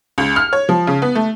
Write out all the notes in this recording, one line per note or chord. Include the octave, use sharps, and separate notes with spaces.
C#2
F6
C#5
F3
C#3
B3
A3